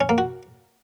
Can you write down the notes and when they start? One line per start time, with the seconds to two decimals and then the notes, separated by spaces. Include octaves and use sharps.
0.01 C#4
0.09 A#3
0.18 F#4